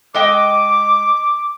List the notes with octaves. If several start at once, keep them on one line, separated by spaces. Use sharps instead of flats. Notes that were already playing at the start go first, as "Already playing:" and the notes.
G#3 D#5 G5 D6